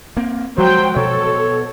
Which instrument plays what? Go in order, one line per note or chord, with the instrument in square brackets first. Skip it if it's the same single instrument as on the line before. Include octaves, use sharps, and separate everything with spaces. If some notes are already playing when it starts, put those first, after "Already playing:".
[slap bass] A#3 C4
[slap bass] F3 G#3 [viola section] F#3 G5 [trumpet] C5
[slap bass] B2 [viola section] A4 [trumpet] C#5